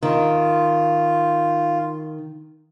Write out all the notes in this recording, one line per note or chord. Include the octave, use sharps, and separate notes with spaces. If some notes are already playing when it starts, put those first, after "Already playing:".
D#3 F4